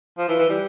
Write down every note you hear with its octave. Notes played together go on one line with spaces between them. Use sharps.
F3
E3
E3
G3